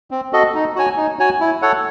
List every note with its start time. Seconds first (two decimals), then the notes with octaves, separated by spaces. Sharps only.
0.11 C4
0.33 F#4 A4 D#5
0.55 D#4
0.76 F#4 C#5 G#5
0.97 D#4
1.19 F#4 C#5 G#5
1.41 E4
1.62 A4 C#5 F#5